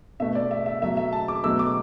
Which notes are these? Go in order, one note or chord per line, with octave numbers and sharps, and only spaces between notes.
B2 A3 E5
D5
E5
E5
B2 F#3 A3 E5
E5
A5
D6
B2 F#3 A3 E6
D6